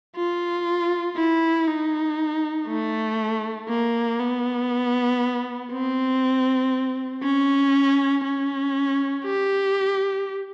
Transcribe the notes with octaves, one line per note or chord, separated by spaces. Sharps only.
F4
E4
D#4
A3
A#3
B3
C4
C#4
C#4
G4